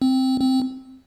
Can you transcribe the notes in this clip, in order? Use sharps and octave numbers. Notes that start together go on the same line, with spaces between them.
C4
C4